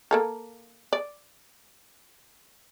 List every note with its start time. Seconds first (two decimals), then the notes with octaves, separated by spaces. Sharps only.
0.11 A#3 A4 A#4
0.93 D5